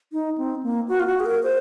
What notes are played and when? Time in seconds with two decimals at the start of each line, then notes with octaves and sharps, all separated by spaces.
0.13 D#4
0.38 C4
0.63 A#3
0.88 F#4
1.00 F4
1.07 F#4
1.20 G#4
1.26 A#4
1.43 C5